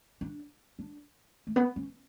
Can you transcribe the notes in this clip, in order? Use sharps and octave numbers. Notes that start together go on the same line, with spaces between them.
D4
D4
A3
B3
C#4